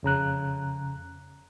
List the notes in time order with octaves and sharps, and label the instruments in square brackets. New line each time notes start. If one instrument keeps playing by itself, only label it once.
[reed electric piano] F2 C#3 A#5 F#6